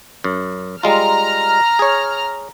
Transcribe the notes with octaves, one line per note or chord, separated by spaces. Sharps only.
F#2
G3 G#3 F4 A#5 F6
G#4 C#5